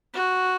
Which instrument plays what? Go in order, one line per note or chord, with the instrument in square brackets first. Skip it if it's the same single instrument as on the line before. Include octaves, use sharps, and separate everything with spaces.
[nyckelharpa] F#4